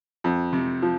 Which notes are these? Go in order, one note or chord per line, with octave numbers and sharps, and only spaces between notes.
F2
C3
F3